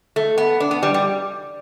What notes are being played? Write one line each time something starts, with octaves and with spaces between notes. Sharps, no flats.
A3
B3
D4
B3
G3
G3